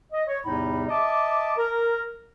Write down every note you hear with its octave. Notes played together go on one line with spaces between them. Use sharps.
D#5
C#5
E2 A2 C3 G3 D#4 B5
D#5 E5 A5 D6
A#4